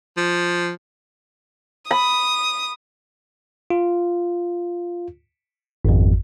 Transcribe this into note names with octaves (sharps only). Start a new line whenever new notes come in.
F3
B5 D#6
F4
G#1 F2